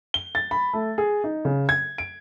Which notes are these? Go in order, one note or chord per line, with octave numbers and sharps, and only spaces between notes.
G7
A6
B5
A3
G#4
D#4
C#3
G#6
D7